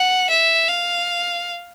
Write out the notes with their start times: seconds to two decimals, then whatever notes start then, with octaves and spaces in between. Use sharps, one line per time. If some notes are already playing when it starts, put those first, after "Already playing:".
Already playing: F#5
0.30 E5
0.69 F5